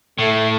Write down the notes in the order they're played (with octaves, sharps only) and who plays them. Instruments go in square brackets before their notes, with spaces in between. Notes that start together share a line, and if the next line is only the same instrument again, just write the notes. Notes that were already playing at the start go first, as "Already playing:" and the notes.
[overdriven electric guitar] A2 [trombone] A3